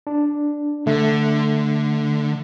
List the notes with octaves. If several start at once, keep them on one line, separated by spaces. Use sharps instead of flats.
D4
D3 A3